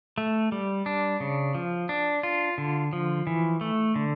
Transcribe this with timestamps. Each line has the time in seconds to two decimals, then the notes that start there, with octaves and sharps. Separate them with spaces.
0.18 A3
0.52 G3
0.86 D4
1.20 C#3
1.55 F3
1.89 D4
2.23 F4
2.58 D3
2.93 F3
3.27 E3
3.61 A3
3.96 D3